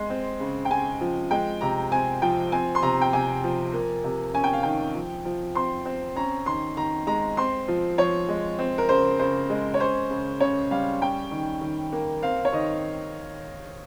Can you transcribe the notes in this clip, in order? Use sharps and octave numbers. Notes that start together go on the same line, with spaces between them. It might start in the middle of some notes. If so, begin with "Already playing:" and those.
Already playing: G#3 C6
C4
C#3
G5
C#3 G#5
F3
G#3 G5
C3 A#5
C4 G#5
F3 G5
C4 G#5
C6
C3 A#5
G5
C3 G#5
F3
A#3
C3
C#4 G#5
G5
F5
D#3 G5
F3
F3
C4 C6
C4
C#4 A#5
D#3 C6
D#3 A#5
G#3 A#5
C4 C6
F3
F3 C#5
G#3
C4
A#4
C#3 C5
C#3 C5
G#3
C#5
C#4 C5
C#3
C#3 C#5
G3 F5
C#4 G5
D#3
D#3
A#3
C4 F5
C#5
D#3 D#5